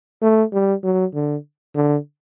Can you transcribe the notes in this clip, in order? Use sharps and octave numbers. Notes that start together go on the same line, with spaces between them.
A3
G3
F#3
D3
D3